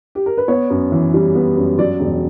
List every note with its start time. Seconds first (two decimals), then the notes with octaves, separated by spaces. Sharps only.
0.15 G4
0.26 A#4
0.37 B4
0.48 B3 C#5
0.70 F#2
0.92 E3
1.14 G3
1.35 B3
1.57 F#2
1.79 F#3 D5
2.00 E1